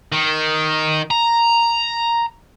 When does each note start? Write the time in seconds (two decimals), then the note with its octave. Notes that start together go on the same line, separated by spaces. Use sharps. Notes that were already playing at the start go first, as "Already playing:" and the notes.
0.12 D#3
1.11 A#5